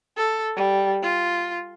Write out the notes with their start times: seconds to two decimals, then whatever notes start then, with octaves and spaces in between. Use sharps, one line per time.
0.17 A4
0.56 G3
1.03 F4